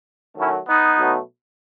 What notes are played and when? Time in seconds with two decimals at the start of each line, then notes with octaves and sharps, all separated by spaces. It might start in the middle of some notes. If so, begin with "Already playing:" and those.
0.38 D#3 F#3 A3 C#4 E4
0.67 B3 D#4
0.98 B2 F#3 A3